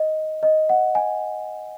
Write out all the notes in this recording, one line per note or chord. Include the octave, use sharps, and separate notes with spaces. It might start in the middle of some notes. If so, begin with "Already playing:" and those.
Already playing: D#5
D#5
F#5
G#5